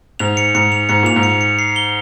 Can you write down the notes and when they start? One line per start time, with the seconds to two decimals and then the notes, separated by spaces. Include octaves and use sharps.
0.19 G#2 F7
0.37 C#7
0.55 G#2 C#7
0.72 F7
0.89 G#2 C#7
1.03 A#2 F7
1.16 G#2
1.23 C#7
1.41 C#7
1.59 C7
1.76 G7